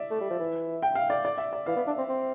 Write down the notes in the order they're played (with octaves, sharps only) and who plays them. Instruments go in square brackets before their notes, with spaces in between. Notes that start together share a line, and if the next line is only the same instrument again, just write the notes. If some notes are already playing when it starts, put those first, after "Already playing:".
Already playing: [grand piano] D5 E5
[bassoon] A3
G3
F3
E3
[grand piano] G5
F5
D5
D5
E5
D5
[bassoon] E3 [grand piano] F5
[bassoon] B3
D4
C4
C4